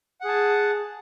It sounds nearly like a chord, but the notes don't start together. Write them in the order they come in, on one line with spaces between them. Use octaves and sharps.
F#5 G#4 A5